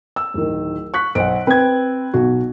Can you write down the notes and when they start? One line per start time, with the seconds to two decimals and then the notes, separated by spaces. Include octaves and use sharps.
0.16 E6
0.34 D1 D#3
0.94 C#6 F#6 B6
1.15 B1 C5 F#5 D7
1.47 C4 B4 G#6
2.14 B1 F#4